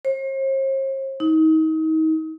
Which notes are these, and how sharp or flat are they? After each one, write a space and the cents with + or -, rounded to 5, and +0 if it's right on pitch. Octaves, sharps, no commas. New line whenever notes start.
C5 +45
D#4 +30